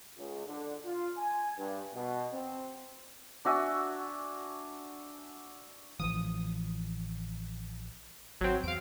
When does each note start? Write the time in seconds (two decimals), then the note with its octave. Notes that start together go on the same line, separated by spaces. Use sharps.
0.17 C#2
0.46 D3
0.85 F4
1.17 G#5
1.57 G2
1.95 B2
2.33 C4
3.45 D4 F#4 E5 G#5
6.00 A1 E3 F3 D#6
8.41 G#1 F#3 C4
8.64 E2 F5 D7